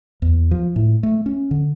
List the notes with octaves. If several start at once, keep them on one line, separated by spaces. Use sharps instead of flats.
E2
F3
A2
A3
C#4
D3